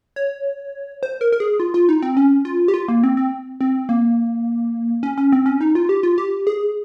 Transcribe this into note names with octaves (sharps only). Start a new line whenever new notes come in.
C#5
C5
A#4
A#4
G#4
F4
F4
D#4
C4
C#4
F4
G4
F4
A#3
C4
C4
C4
A#3
C#4
C#4
C4
C#4
D#4
F4
G4
F4
G4
G#4